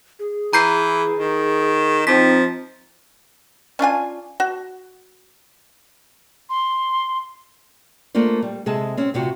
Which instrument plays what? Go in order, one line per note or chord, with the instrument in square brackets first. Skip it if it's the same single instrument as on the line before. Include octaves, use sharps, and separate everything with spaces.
[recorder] G#4
[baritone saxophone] E3 [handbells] A#5 G6 C7
[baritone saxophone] D#3
[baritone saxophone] F3 [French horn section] C4 D#4 [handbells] B6
[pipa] C#4 D4 F4 G#5
F#4
[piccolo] C6
[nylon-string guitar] A3 A#3 D4 F4 C5
G3
C3 G#3 G#4 A4 A5
C4 C#4
D2 C3 F4 F#4